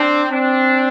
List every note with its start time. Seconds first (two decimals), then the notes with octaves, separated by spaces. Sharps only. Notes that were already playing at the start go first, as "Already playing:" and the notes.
Already playing: C4 D4
0.30 C4 D4